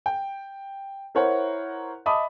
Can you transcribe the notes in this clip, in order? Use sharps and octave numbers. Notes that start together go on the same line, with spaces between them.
G5
E4 A#4 C5 C#5 F#5
D#5 E5 A5 B5 D6 D#6